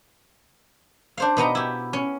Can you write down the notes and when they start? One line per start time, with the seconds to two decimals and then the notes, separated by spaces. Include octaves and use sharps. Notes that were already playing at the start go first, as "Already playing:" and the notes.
1.17 D4 C5 F5
1.37 B2 B3 D#4 A#5
1.55 E4 G4
1.93 C#4